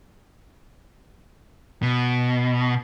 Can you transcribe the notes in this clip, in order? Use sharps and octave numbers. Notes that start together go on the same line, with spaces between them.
B2